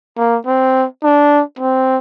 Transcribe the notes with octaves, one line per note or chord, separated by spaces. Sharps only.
A#3
C4
D4
C4